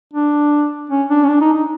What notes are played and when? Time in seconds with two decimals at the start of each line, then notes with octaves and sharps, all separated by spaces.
0.14 D4
0.90 C#4
1.10 D4
1.24 C#4
1.28 D4
1.41 D#4
1.54 D#4